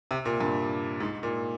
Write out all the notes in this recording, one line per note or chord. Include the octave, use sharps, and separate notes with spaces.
C3
A#2
G2
G#2
A#2